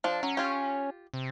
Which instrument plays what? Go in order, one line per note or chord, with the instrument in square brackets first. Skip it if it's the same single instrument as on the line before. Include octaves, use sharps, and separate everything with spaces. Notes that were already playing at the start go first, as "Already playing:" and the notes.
[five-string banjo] F3 D4
[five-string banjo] F#3 [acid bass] C#4
[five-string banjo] F4 G4
[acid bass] C3